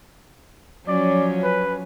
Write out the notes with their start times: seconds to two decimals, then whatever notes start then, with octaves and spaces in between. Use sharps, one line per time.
0.88 F3 F#3 C#4 D5
1.43 B4